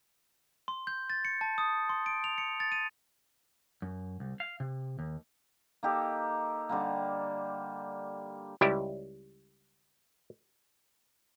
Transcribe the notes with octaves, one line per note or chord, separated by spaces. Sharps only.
C6
G6
A6
C#7
A5
D#6
C6
D7
F7
C#7
A6
D#7
F#2
C2
F5
C3
D#2
A#3 D#4 G4 A4
D3 G3 A#3
C#2 G3 E4 G4